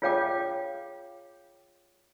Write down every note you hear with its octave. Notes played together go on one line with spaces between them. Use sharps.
F4 G#4 C#5 F5 G5 D6